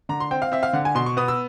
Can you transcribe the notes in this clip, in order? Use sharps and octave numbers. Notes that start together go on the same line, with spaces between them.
D3 A#5
C6
C4 G5
F5
C4 E5
F5
D3 F#5
G#5
B2 C6
C#6
B3 D#6
E6